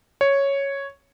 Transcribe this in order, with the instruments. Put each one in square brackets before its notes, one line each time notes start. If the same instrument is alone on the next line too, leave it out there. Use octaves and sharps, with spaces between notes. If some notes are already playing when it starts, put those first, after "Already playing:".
[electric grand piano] C#5